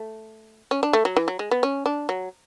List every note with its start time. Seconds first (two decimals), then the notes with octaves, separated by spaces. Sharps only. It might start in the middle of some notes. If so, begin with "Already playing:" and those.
Already playing: A3
0.71 C#4
0.83 D4
0.93 A3
1.05 F#3
1.16 E3
1.28 F#3
1.39 G#3
1.51 B3
1.63 C#4
1.86 D4
2.09 F#3